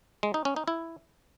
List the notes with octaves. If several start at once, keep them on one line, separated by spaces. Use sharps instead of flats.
G#3
D#4
C#4
D#4
E4